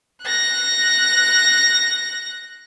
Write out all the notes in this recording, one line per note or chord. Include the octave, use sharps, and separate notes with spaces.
F#6 A#6